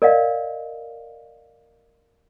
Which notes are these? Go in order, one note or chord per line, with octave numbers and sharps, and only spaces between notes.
A#4 D5 D#5 F5